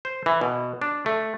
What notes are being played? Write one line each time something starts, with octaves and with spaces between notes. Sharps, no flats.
C5
E3
B2
D4
A3